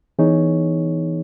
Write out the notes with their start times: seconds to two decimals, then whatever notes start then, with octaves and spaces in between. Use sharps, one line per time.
0.19 E3 B3 D#4 G#4 C#5